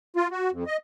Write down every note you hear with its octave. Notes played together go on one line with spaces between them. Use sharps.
F4
F#4
F2
D#5